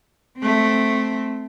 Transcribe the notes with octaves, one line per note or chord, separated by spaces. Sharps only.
A3 C4